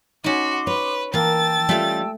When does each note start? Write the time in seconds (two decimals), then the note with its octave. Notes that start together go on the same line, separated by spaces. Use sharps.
0.24 C#4 D#4 F#4 C6 D6
0.67 B4 C#5
1.14 E3 A#3 A#4 G5 A5 E6 A6
1.69 G3 A3 C#4 F4 A4